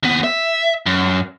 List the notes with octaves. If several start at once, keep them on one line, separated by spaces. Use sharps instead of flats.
D#2 B3
E5
F#2